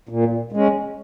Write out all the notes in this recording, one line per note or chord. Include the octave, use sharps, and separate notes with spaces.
A#2
G#3 C#4